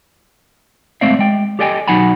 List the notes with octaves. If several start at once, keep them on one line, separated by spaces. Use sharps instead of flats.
G#3 A3 C4 D5 E5 F5
G#3 G5
G4 A4 D5 D#5 G5 G#5
B1 F#3 D#4 F#5 G#5 B5